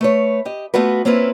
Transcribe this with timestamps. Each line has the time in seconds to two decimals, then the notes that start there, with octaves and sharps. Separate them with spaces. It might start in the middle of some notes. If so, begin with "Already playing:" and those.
0.01 A3 B4 C#5
0.45 G4 D#5
0.74 A3 B3 F4 F#4 B4
1.05 A#3 C4 C#4 E4 F4 B4